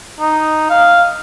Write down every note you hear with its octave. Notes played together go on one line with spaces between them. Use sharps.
D#4
F5